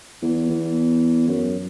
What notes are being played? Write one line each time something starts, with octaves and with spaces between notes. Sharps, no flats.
E2
E2
F#2